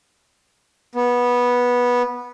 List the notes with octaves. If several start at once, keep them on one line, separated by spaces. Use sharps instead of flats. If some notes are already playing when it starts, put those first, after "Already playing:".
B3